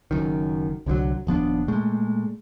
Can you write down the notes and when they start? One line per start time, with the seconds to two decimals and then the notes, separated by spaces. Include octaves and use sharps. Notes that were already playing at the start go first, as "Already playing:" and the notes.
0.11 F#1 F#2 D#3
0.86 C2 D3 E3 F#3
1.27 D#1 F3 B3 D4
1.68 A#2 G#3 A3